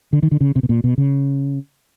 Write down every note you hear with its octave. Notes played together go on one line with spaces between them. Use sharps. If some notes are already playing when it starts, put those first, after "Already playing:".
D3
D#3
D3
C#3
C3
B2
A#2
B2
C#3